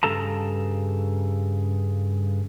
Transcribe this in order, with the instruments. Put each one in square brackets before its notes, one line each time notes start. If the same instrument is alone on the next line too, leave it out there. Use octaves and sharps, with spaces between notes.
[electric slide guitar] G2 C#3 A4 A5 A#5